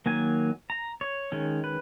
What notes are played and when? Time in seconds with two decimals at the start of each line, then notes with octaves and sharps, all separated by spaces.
0.06 D#3 F#3 A#3 G#5
0.70 A#5
1.01 C#5
1.32 D#3 G#3 C#4
1.64 B4